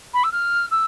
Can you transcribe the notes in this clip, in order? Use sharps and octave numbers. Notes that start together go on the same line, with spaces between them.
B5
E6
F6
E6